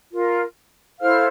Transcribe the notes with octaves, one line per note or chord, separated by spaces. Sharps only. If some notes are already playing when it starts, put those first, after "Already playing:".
F4 A#4
E4 A4 C5 F5 F6